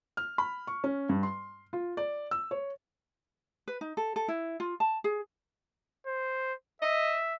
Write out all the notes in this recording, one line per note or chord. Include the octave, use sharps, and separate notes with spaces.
F6
B5
C#6
C#4
G2
C6
F4
D5
E6
C#5
B4
D#4
A4
A4
E4
F4
A5
G#4
C5
D#5 E5